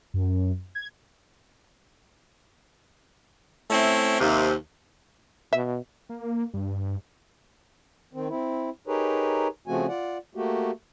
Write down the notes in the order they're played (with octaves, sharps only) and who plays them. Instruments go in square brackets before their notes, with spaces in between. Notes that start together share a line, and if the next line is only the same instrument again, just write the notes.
[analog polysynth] F#2
G#6
[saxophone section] A3 C4 C#4 E4
D#2 C3
[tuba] B2 [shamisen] E5
[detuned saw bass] A#3
G2
[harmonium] D#3 C4
C4 E4
D#4 G4 G#4 A#4 B4 C#5
C#3 F3 A3 C4 F#4 G#5
F4 D5 F#5
A3 A#3 F#4 G4